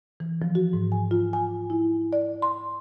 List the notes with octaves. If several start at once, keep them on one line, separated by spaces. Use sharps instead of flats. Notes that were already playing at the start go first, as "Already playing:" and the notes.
E3
F3
F#4
G#2
G#5
F4
G#5
E4
D5
C6